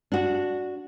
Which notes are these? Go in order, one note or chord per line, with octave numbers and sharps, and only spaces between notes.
D4 F#4